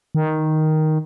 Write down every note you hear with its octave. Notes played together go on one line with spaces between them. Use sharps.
D#3